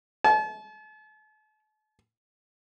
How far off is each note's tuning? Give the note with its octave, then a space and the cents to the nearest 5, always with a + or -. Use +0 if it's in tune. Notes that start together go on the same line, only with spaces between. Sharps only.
A5 -40